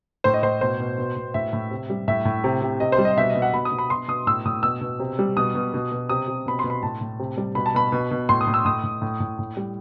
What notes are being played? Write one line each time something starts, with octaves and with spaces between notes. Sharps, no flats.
A2 C5
D#5
A2 C5
B2 C5
B2
B2
B2
A2 E5
A2
C3
G3
A2 E5
A2
C3
C3
C3 D#5
C5
G3
D#5
B2 E5
D#5
B2
F#5
B2 B5
D#6
B2
B5
B2 C6
B2 D#6
A2 E6
A2 D#6
B2 E6
B2
C3
G3
B2 D#6
B2
B2
B2
C3 D#6
C3
B2 B5
C6
B2
B5
A2 A5
A2
C3
G3
B2 B5
A5
B2 B5
B2
B2
A2 C6
D#6
A2
E6
A2 D#6
A2
A2
A2
A2
G3